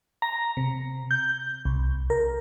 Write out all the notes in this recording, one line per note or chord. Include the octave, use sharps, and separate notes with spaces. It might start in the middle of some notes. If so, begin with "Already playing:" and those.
A#5
C3
G6
C2
A#4